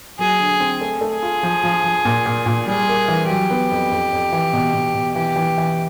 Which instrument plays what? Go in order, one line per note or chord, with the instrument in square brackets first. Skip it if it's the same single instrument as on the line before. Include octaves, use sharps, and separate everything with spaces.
[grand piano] F#3 [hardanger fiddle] G#4
[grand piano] D3
C4
A3
A3
[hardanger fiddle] G#4
[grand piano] F4
F3
F3
F3
A#2
A#2
A#2
[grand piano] G3 [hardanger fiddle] G#4
[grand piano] A#3
E3
[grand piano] F#3 [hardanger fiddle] G4
[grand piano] B3
F2
F2
F2
E3
B2
B2
B2
[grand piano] E3 [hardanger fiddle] G4
[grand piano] E3
E3